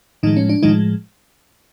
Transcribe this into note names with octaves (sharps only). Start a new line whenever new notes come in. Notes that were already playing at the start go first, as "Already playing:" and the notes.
A2 D#3 F3 G#3 D#4
C#4
D4
A2 D#3 F3 G#3 D#4